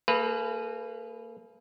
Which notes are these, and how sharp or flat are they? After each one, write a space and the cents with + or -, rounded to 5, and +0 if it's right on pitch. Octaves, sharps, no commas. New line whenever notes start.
A#3 -35 G#4 +40 B4 +0